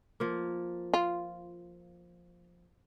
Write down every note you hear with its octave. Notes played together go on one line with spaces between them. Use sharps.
F3 A#3
F4